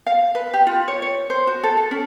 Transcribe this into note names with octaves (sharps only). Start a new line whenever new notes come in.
F5
B4
G4
F4
C#5
C#5
C5
F#4
A4
A4
C#4